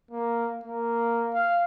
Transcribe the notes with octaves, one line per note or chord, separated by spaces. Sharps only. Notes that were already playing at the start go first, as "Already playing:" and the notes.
A#3
A#3
F5